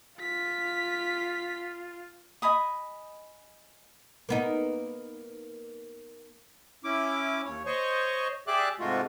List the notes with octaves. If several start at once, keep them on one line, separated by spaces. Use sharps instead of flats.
F4 B6
D#5 G#5 B5 D#6
A#3 B3 D#4
C#4 E4 D6
D#2 C#5
C5 C#5 D#5 C#6
G4 G#4 D5 E5 D6 F#6
G#2 C3 G#3 A3 F4 F#4